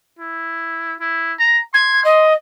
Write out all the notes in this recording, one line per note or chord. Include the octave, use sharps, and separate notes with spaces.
E4
E4
A#5
C6 G#6
D#5